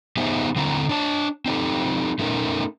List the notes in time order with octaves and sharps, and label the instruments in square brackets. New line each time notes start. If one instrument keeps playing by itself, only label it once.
[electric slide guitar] B3 D#4 G4 G#4 C5 E5
D3 C4 E4 A#5
D4 C#5 A5
C4 D#4 G4 A4
A3 C#4 D#4 A#4